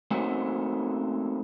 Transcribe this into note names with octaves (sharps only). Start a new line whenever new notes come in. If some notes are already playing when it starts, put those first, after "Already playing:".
A3 A#3 C4 C#4 D#4 F#4